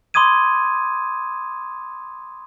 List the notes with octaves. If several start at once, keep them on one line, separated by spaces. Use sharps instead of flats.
B5 C6 D6 D#6 G#6 D#7